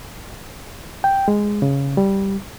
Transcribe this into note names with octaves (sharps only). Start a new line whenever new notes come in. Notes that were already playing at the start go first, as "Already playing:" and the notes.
G5
G#3
C#3
G3